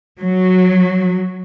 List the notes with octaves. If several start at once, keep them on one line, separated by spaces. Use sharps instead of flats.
F#3